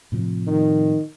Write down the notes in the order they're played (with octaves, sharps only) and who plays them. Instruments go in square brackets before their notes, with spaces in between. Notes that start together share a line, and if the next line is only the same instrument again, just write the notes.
[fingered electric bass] A2 C3 F3
[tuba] D#3